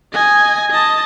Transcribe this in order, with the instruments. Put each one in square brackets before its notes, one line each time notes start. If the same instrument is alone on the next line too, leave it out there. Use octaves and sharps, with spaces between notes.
[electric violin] D#5 G#5
D#5 A5